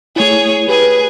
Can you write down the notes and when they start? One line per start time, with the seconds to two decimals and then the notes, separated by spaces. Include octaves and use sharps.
0.16 A3 E4 G#4 C#5
0.69 G4 G#4 B4